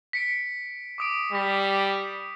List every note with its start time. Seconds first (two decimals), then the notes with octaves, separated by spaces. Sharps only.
0.13 B6 C#7 D7
0.98 D6 D#6 D7
1.32 G3 D#6 B6